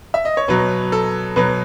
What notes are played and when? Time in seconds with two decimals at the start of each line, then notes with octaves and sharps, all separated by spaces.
0.14 E5
0.25 D#5
0.37 C#5
0.48 B2 F#3 B4
0.92 A4
1.36 B2 F#3 B4